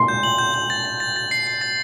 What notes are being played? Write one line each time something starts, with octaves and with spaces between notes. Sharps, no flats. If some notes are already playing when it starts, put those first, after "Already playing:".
Already playing: C6
G6
F#7
G6
G6
A6
A6
A6
A6
C7
C7
A6